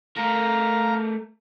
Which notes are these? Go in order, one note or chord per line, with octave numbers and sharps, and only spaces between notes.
A3 A#4 F5 A#5